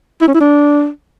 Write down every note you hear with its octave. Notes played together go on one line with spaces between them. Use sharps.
E4
C#4
E4
D4